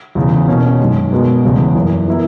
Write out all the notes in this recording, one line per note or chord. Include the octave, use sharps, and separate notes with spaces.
E2 C#3 E3
B2 A#3 C#4
F#2 D#3 G#3
B2 G#3 B3 F#4 A#4
E2 C#3 G#3
F#2 E3 A#3
E3 B3 E4 A#4